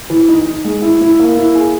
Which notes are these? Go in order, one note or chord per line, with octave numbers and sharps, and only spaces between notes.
E3
D#4
D#4
G#3
E4
E4
A#3
E4
G#4